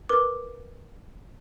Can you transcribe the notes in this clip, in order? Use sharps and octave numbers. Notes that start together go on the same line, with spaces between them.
A#4 B4 D6